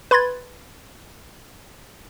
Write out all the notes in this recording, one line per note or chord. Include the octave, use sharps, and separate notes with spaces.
B4 B5 C6 G#6 A6